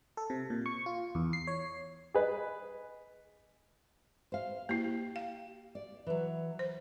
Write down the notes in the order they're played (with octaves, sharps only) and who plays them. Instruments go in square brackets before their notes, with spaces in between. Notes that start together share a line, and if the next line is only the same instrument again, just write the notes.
[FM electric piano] A4
C3
A#2
C#6
F4
E2
C7
C#5
[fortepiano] G#4 B4 D#5
[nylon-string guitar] C5 F5
[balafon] A#3 E4 [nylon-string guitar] G4
[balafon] F5
[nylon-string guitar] D5
E3 F#3
[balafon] C5